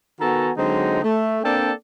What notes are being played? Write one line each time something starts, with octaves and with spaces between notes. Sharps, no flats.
D#3 B3 F#4 A4 G#5 A#5
D3 F#3 G#3 C4 D#4
A3
A#3 C4 D4 A4 D5 G5